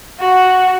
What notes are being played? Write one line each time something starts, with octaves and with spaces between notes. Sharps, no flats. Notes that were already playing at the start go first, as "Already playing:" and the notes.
F#4